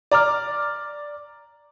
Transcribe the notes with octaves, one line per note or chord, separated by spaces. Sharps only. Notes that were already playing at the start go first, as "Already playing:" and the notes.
D5 A#5 D6 F6